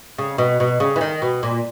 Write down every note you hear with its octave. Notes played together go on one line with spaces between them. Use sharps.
C#3
B2
B2
C#3
E3
D#3
B2
A#2